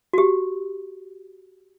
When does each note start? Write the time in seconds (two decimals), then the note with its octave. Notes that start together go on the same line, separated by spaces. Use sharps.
0.13 F#4
0.18 G4